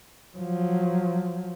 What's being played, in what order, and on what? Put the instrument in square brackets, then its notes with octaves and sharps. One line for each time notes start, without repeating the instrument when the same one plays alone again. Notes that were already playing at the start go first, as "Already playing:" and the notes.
[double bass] F3 F#3